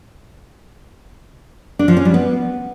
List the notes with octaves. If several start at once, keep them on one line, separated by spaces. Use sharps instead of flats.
D4
F3
C#4
G3
B3